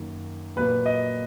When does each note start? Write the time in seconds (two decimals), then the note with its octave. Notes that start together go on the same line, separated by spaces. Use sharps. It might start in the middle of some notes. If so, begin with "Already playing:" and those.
Already playing: F#2 D#3 A#3
0.56 A#2 F#3 A#3 B4
0.86 D#5